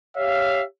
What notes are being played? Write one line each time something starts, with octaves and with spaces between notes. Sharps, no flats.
G4 C#5 E5 F5